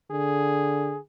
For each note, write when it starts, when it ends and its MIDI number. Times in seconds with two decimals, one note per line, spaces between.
0.11 0.97 50
0.11 0.99 68